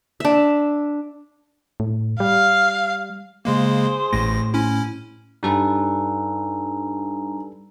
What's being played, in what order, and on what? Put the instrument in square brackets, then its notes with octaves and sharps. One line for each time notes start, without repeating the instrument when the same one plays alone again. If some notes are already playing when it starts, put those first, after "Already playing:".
[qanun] D4 E5
[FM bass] A2
[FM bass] G3 [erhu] F5
[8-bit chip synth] C#3 G#3 A#3 [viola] G#4 C5
[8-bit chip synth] A1 A#6 [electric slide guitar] A2
[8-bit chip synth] C#4 E4
[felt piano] G2 [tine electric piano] G3 A4 B4 [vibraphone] D#4 G#5 A#5